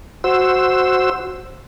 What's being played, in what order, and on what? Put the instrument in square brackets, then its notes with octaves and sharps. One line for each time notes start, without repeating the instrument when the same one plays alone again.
[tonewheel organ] F#4 C5 E6